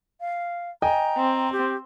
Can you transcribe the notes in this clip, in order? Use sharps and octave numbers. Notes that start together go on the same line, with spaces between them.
F5
D#5 G5 G#5 A#5
C4
G4